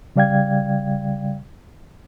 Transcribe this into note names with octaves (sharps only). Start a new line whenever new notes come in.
C#3 G3 D5 F5 G5 G#6